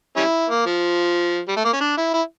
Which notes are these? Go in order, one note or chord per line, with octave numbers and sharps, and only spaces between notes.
G3 C#4 E4
A#3
F3
G3
A3
A#3
C#4
D4
E4
E4